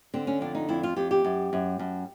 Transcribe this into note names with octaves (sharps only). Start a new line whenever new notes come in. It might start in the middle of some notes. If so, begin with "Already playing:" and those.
D3 C4
C#4
F2 D4
D#4
F2 E4
F4
F2 G4
G4
F#2
F#2
F#2